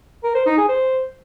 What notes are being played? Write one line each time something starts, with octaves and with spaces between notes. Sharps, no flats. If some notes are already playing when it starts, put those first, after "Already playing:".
A#4
C5
D#4
G#4
C5